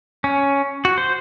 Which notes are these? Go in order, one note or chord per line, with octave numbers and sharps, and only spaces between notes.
C#4
F#4
C5